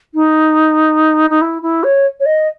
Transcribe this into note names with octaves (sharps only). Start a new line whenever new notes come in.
D#4
D#4
E4
E4
C#5
C#5
D#5